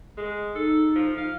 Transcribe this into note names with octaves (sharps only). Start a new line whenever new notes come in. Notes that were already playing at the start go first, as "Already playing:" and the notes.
G#3
D#4 A4
F3
F5